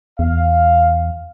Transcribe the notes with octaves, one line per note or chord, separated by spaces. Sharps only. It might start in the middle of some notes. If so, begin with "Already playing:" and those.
E2 F5